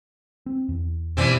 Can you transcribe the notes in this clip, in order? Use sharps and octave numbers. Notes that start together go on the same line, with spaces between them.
C4
E2
F#1 B2 E3 G3 C4